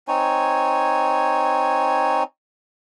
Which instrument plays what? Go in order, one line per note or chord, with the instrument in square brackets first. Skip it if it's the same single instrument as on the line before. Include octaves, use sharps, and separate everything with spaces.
[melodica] C4 D#4 C#5 G#5